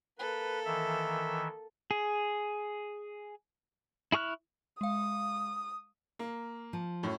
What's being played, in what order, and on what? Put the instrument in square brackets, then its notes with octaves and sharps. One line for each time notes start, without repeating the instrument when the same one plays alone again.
[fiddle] A#3 A4 [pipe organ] B4
[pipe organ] D#3 E3 E5
[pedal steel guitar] G#4
E4 G#4 C#6 F6 F#6
[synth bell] G#3 F5 [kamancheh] D#6
[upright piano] A#3
[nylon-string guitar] F3
[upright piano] F#2 A2